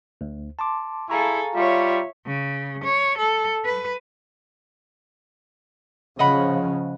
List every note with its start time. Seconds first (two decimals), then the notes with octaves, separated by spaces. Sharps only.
0.21 D2
0.59 A5 C6 D6
1.10 E4 G#4 A4 F5 A#5 C#6
1.55 G3 F4 C#5 E5
2.26 C#3
2.84 C#5
3.18 A4
3.65 B4
6.19 C#3 F3 D#5 F#5 B5